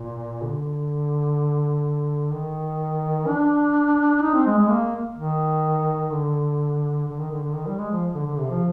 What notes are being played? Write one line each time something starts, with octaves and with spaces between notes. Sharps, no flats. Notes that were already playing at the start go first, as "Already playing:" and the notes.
Already playing: A#2
D3
D#3
D4
D#4
C4
G#3
G#3
A#3
D#3
D3
D3
D#3
D3
D3
D#3
G3
G#3
F3
D3
D3
C3
F3